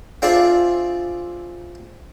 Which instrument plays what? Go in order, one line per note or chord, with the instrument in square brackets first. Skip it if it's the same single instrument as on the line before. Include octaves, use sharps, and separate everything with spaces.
[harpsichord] C4 D4 F4 G#4 E5